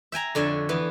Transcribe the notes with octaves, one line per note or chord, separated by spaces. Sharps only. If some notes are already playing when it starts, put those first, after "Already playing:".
E5 G5 G#5 A#5
F2 D3 C#5 G#5 A5
E3 B3